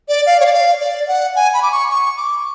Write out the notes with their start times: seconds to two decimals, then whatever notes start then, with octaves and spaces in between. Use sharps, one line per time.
0.09 D5
0.26 F5
0.40 C#5
0.46 D5
0.53 F5
0.80 D5
1.08 F#5
1.36 G#5
1.54 B5
1.62 D6
1.72 C#6
1.91 C#6
2.17 D6